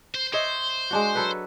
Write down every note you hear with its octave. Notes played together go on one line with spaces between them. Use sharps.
C5
C5 C#5 D#5 E5
G#3 D4 F#4
F#3 A4 B4